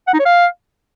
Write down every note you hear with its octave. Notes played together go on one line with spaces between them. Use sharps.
F#5
D#4
C#5
F5